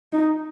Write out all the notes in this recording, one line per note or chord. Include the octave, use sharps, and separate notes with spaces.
D#4